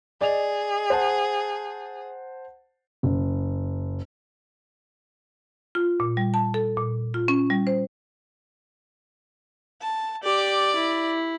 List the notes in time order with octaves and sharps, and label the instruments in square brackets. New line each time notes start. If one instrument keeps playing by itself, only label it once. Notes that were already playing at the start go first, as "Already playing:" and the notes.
[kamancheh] G#4 [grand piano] D5 D#5 F7
[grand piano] C5 F#5 A5
[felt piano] F#1
[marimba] F4
A#2
G3
A5
A4
A#2
F4
C#4
G3
C5
[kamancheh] A5
[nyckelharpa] G4 [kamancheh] D5
[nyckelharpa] E4